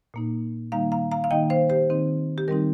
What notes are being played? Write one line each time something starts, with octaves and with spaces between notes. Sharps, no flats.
A#2 A#3 D#4
D#3 G3 A#3 D#4 F5 A#5
F5 A#5
F5 A#5
F5
D#3 A#3 D#4 D#5 G5
C5 F5
G4 C5
D#3 C4 D#4
G4
D#3 G3 C4 D#4 A#4